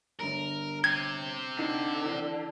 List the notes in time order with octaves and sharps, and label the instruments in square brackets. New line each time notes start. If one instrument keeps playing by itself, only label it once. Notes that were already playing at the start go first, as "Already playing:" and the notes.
[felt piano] G1 D4 A#5 [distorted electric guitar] A#4
[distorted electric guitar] C4 G4 [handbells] G#6
[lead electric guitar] D3 [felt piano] D#4
[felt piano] E3 D5